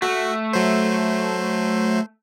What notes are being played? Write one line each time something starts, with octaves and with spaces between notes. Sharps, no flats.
A3 F#4
F#3 C5